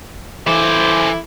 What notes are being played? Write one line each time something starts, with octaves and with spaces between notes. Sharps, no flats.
E3 E4 A4 C5 D6